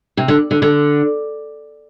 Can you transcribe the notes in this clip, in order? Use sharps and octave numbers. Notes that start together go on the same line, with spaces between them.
C3
D3
D3
D3